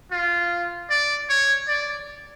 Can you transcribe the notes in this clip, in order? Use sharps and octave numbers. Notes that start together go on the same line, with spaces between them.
F4
D5
C#5
D5